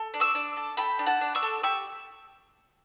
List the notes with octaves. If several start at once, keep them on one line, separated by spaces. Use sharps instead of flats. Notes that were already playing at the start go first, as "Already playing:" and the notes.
Already playing: A4
D4
C#6 E6
D4
A4
A4 G5 B5
D4
F#5 A5
D4
C#6 E6
A4
G4 C#6 E6